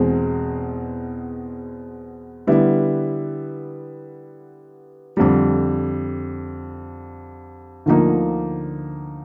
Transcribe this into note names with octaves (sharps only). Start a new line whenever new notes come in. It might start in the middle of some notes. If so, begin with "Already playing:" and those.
Already playing: E2 B2 G#3 C4
D3 G3 B3 E4
F2 D3 G3
D2 D3 F3 A#3 D#4